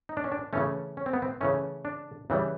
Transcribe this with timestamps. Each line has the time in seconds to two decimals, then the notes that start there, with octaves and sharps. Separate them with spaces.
0.09 D#4
0.17 D4
0.24 C#4
0.32 D4
0.53 C#3 E3 A3 C#4
0.97 C#4
1.06 C4
1.13 B3
1.22 C4
1.41 C#3 E3 A3 C#4
1.85 D4
2.30 C#3 E3 G3